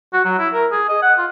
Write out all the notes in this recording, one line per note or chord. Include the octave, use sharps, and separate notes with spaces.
F#4
F#3
E4
A#4
G#4
D#5
F#5
F4